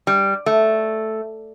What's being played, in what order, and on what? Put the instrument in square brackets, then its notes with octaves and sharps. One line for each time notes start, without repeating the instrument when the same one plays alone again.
[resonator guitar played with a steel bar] G3
A3